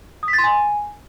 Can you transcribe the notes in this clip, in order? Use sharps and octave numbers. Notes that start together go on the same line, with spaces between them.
D#6
B6
A6
C6
G#5